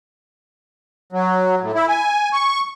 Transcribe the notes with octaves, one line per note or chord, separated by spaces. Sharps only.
F#3
A2
E4
G#5
C#6